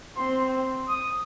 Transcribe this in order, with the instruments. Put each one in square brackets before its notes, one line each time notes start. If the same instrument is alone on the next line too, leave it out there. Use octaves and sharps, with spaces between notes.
[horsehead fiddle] C4 [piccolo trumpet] C6
[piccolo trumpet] D#6